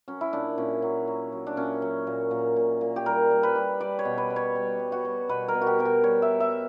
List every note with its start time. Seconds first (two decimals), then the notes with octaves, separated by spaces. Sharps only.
0.08 F#3 C#4
0.21 E4
0.33 A#2 D4
0.57 A#2 C#4
0.82 F#3
1.07 F#3
1.32 F#3
1.47 D4
1.57 A#2 C#4
1.82 F#3
2.07 A#2
2.31 A#2
2.56 A#2
2.81 A#2
2.96 G4
3.06 G3 A#4
3.31 G3
3.43 B4
3.55 G3
3.81 G3 D5
3.99 C#5
4.05 B2
4.18 B4
4.30 G3
4.36 C#5
4.55 G3
4.79 G3
4.92 F#4
5.05 G3
5.29 B2 B4
5.48 A#4
5.54 B2
5.61 F#4
5.66 G4
5.79 B2 A#4
5.85 G4
6.04 G3 C#5
6.22 E5
6.29 G3
6.40 E5